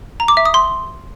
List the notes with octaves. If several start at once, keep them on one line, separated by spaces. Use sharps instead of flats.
A#5
D6
E5
D#6
C6